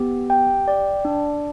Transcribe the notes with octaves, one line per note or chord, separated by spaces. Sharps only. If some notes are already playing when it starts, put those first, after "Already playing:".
Already playing: B3 G4
G5
D5
D4